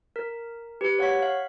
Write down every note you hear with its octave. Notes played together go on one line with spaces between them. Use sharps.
A#4
G4 B4
C#5 F5 F#5 C#6 G#6 B6
F5